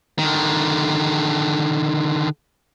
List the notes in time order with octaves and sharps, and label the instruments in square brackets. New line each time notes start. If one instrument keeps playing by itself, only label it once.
[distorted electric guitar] D3 D#3